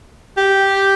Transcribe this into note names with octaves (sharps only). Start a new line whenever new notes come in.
G4